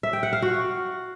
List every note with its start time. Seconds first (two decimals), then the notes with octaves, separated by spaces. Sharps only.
0.03 E5
0.13 G5
0.23 F#5
0.33 F5
0.42 F#4